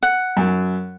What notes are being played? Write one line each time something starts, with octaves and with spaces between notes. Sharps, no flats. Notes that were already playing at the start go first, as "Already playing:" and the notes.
F#5
F#2